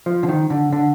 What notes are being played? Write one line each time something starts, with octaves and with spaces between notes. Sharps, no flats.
F3
D3
D#3
D3
D3